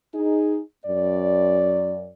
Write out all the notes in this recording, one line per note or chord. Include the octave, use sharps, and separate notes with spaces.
D#4 G#4
F#2 D5